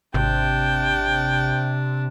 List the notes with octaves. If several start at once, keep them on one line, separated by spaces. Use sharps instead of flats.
G#1 C3 D4 G5